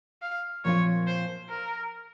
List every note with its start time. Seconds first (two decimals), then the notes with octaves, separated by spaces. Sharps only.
0.22 F5
0.64 A#2 F3 C4 F4 C#5
1.07 C5
1.49 A#4